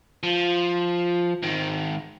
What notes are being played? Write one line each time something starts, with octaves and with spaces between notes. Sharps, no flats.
F3
G#2 D#3